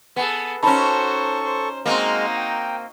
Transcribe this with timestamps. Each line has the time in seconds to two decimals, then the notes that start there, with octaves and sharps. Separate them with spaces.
0.16 B3 G#4 A4
0.63 C#4 D#4 F#4 A4 C5 A5 B5 C#6
1.44 C5
1.86 G#3 A#3 C4 D#4 F#4 F6
2.37 G5